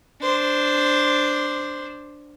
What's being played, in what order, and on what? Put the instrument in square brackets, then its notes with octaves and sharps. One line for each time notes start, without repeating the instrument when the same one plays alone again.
[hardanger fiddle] D4 C5